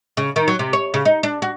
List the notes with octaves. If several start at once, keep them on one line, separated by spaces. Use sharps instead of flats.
C#3
D#3
F#3
C3
C#5
C#3
D#4
D4
F#4